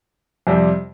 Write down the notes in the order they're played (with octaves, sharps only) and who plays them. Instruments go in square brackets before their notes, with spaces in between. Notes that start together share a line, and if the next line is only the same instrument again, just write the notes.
[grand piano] F2 C3 G3